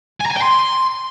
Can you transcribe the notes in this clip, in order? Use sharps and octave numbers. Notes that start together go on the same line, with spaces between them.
G#5
A#5
G#5
G5
C6